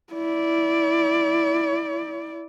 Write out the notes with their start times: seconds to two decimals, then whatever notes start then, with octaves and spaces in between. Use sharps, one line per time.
0.13 E4 D5